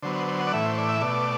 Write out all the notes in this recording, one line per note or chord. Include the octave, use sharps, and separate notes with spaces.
D3 F#3 B3 C5
C5
C5
F#5
D5
A2 E3 A3 E5
C5
D5
E5
B2 A3 D5